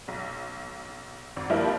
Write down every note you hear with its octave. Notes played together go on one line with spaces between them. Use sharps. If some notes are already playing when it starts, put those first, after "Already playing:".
B1
G#1
G2 F3 G3 A#3 E4 F4